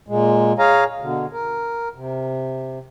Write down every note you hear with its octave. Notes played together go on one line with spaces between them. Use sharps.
A#2 G#3
G#4 C#5 F5 G#5 A#5
B2 D3
A#4
C3